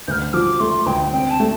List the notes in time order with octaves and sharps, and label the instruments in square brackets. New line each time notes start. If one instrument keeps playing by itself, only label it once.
[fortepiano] D2 [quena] F6 G6
[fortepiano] F3 [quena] D6
[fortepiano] A3 [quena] C6
[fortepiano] D2 [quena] G5
[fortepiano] C4 [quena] G5
[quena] A5
[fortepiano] A3